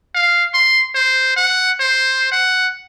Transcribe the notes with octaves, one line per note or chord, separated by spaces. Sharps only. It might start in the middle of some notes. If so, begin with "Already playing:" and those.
F5
C6
C5
F#5
C5
F#5